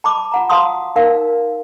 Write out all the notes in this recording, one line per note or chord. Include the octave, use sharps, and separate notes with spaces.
A5 B5 D6
F4 F#5 A#5
F#4 F5 A5 C6 D#6
D#4 A#4 F5